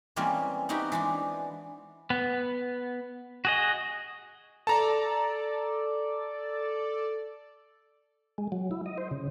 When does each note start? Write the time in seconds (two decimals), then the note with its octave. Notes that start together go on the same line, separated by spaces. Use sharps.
0.16 E3 G3 G#3 A#3 C4 C#4
0.69 B3 C4 D#4 E4 F#4 G4
0.92 E3 G#3 D4
2.10 B3
3.45 F#4 G#4 D#5
4.67 A4 D5 A5 A#5
8.38 G#3
8.52 F#3
8.71 E4
8.86 D#5
8.98 C5
9.11 C#3